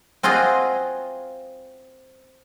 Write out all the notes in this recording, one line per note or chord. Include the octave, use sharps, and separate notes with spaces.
C4 F4 F#4 G#4 D#5